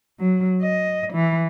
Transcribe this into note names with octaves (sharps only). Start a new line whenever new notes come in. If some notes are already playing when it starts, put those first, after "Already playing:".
F#3
D#5
E3